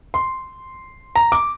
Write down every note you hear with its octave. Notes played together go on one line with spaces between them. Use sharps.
C6
A#5
D6